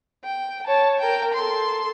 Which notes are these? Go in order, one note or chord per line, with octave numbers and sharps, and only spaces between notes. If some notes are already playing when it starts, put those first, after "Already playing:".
G5
C#5 A5
A#4 G5
A4 C6